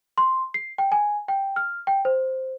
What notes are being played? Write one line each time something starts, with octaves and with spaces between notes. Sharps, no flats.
C6
C7
G5
G#5
G5
F6
G5
C5